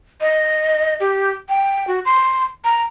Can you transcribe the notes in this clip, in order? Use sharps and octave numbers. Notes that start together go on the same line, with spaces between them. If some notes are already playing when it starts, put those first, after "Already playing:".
D#5
G4
G5
F#4
C6
A#5